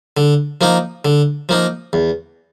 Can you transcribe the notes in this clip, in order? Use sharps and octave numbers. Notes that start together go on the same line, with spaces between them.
D3
F3 A#3 D#4
D3
F3 A#3 D#4
E2